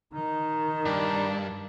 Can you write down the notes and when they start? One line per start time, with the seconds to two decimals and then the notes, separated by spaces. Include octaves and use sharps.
0.13 D#3 D#4
0.85 G2 D4